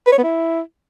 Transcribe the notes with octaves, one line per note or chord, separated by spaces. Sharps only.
B4
C#5
B3
E4